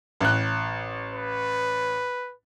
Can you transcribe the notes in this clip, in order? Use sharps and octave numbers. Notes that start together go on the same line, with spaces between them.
A1 F#6
B4